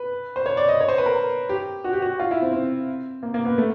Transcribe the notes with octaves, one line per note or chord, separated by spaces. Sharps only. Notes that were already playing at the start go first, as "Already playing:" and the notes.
Already playing: B4
C5
C#5
D5
D#5
C#5
C5
B4
A#4
G4
F#4
G4
F#4
F4
E4
C4
C4
A#3
A#3
B3
A3